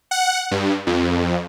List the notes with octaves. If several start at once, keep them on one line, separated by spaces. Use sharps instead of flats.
F#5
G2
F2